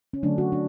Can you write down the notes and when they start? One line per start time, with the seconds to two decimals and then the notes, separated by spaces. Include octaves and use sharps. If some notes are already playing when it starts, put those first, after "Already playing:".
0.13 C#4
0.23 D3 F#3 A3 D4
0.38 F#4
0.52 D4